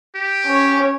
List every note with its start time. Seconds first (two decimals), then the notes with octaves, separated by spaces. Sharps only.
0.15 G4
0.46 C#4 C#5